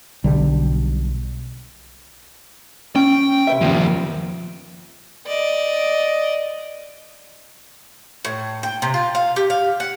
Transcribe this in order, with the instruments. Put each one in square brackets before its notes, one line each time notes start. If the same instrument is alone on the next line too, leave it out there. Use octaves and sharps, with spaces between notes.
[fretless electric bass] B1 D3 G3
[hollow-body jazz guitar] C#4 [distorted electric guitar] G5
[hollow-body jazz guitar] C3 B4 E5
[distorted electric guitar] D#2 F3
[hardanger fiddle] D5 D#5
[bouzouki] A2
G5
C3
F4
F5
G4
F5
F#5